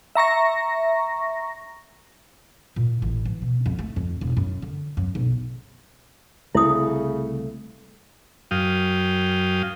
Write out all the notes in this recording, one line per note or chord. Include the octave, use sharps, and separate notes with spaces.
E5 A#5 C#6 A#6
A#2
A1
E3
B2
F2
A3
F2
E1
F#2
D3
F#2
B1
C2 C#3 A3 E4 D#6
F#2 F5 G5 D#6